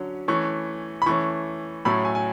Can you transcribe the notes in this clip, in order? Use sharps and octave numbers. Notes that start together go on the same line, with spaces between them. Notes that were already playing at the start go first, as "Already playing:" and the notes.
Already playing: D3 F#3 C#4
E3 A3 C#4 C#6
B5
E3 A3 C#4 C#6
A2 F#3 A3 C#4 B5
G#5
G#5